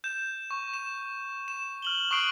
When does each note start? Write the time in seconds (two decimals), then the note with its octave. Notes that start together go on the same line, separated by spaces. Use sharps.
0.04 G6 E7
0.51 C#6
0.74 E7
1.48 E7
1.82 F6 F#7 G7
2.11 C#6 D#6 F#6 C7 D7 F#7